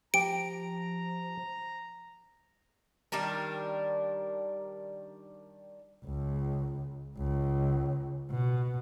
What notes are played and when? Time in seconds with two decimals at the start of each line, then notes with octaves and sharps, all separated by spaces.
0.14 F3 G4 A#5 D7
3.12 D#3 G3 D4 A#4
6.05 C#2
7.18 C#2
8.31 B2